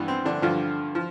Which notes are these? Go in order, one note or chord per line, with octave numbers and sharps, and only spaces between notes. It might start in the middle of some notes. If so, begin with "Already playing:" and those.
Already playing: G2 E3 B3
C4
D3 D4
G2 D3 F3 F4
F3